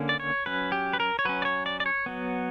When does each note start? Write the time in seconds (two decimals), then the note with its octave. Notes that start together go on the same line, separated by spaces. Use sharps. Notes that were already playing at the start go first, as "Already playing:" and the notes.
Already playing: D3 A#3 C#4
0.09 D5
0.20 C#5
0.46 F#3 C#4 B4
0.72 G4
0.93 B4
1.00 A#4
1.19 C#5
1.25 F#3 C#4 B4
1.42 D5
1.45 C#5
1.66 D5
1.80 D5
1.86 C#5
2.06 F#3 B3